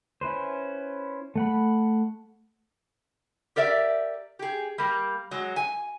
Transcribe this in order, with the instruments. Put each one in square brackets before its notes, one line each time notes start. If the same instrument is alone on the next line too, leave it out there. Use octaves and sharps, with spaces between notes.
[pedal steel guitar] C#4 E4 B4 C5
A3 F#5 B5
[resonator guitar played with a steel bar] G4 A#4 D5 E5
G4 G#4
G3 A#3
F#3 G#3
G#5